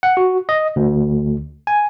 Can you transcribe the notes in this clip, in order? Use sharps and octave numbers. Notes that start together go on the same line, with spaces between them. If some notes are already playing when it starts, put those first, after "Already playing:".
F#5
F#4
D#5
D2
G#5